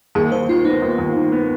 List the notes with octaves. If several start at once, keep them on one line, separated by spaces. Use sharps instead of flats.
D#2 G#4
D#2 C5
D#3 F4
B3 D#4
D#2
D#2
D#3
B3